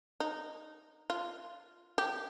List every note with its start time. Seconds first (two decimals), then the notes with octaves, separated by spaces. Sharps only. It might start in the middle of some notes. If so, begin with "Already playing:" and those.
0.20 D#4
1.10 F4
1.98 G4